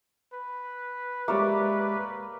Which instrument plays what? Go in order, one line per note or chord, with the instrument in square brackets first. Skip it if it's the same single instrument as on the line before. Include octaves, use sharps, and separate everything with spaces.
[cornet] B4
[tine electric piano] G#3 G4 E5 [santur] A#3 C#5 D5